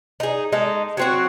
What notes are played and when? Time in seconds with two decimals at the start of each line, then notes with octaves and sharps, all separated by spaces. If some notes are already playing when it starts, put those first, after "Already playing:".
0.20 D#4 G#4
0.52 G#3 D#4 A4
0.97 F#3 C4 F#4